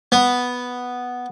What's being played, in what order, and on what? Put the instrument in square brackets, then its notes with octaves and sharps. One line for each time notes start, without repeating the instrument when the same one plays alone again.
[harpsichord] B3